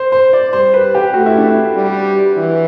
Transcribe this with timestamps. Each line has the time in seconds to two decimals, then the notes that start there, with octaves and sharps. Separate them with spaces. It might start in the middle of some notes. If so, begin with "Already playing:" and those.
Already playing: C5
0.12 C5
0.33 D5
0.53 G3 C5
0.74 B4
0.95 G4
1.14 A3 F#4
1.26 E4
1.38 D4
1.49 E4
1.75 G3
2.37 E3